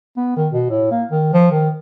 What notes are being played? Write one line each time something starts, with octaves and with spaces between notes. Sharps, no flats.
B3
D#3
B2
A2
A#3
D#3
F3
D#3